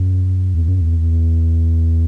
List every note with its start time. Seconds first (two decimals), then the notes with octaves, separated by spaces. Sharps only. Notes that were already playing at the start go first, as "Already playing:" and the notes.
Already playing: F#2
0.54 E2
0.68 F#2
0.81 E2